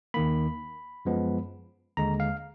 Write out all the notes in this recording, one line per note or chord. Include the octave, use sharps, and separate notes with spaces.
D#2 D#3 A#3 B5
F#2 F3 G#3 B3
D#2 D3 G#3 A#5
F5